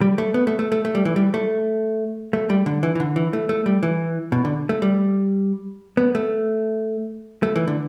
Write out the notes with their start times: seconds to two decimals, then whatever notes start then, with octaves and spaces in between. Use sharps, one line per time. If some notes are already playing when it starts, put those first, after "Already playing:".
0.01 G3
0.18 A3
0.34 B3
0.47 A3
0.59 A3
0.72 A3
0.85 A3
0.95 G3
1.05 E3
1.16 G3
1.34 A3
2.33 A3
2.50 G3
2.66 D3
2.83 E3
2.95 E3
3.00 D3
3.16 E3
3.33 A3
3.49 A3
3.66 G3
3.83 E3
4.32 B2
4.45 D3
4.69 A3
4.82 G3
5.97 B3
6.15 A3
7.43 A3
7.56 E3
7.67 D3